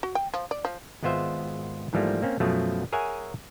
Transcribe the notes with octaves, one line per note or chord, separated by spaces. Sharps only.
F#4
G5
F3
D5
F3
G#1 G#3 B3 F4 C5 E5
G#2 E3 F3 G3 A3 A#3
A#3 C4 C#4
F#2 B2 F3 F#3 A3
G#4 A#4 C#5 E5 F#5 G#5